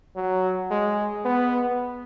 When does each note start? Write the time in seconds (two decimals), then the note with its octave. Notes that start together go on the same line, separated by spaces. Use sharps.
0.16 F#3
0.71 G#3
1.25 B3